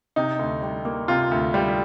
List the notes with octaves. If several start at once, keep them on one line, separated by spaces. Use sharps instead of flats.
C3 D#4
D2
G3
A#3
C3 F4
D2
G3